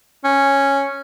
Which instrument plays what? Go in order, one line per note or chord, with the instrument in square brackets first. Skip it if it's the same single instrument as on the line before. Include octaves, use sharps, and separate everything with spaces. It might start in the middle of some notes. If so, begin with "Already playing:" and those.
[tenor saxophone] C#4